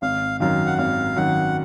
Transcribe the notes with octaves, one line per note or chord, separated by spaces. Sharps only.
G#1 F5
F#2 D#3 F5
F#5
G#1 F5
F#2 D#3 F#5